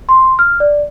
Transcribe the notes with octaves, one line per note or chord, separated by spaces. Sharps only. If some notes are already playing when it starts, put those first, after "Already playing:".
C6
F6
D5